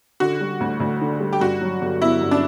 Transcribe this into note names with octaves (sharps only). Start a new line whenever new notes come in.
D3 F#4
G3
D2
D2
D3
G3
G4
G2 F#4
F#3
G1
B3 E4
G2
D4